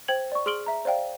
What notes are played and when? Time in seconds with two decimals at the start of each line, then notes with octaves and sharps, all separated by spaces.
0.08 C5 G5 G#6 F#7
0.32 D5 C#6
0.46 G#4 C6 F6 D7 F#7 G7
0.66 E5 A#5
0.85 C5 D5 F5 G5